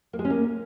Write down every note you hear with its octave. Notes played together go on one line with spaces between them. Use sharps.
A#3
G#3
C#4
A#3